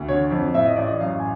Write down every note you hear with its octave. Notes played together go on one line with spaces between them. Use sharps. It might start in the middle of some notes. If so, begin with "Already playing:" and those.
Already playing: D2
D3 C#5
F2
A2 E5
D#5
A1 D5
D#5
F#2 F5
G#5